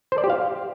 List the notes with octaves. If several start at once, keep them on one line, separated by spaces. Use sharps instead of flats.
C5
D5
G4
F5